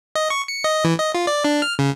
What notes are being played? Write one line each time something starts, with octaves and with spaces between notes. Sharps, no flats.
D#5
C#6
C#7
D#5
E3
D#5
F4
D5
D4
F6
C#3